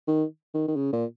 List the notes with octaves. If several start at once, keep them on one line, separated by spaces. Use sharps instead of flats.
D#3
D#3
D#3
C#3
A#2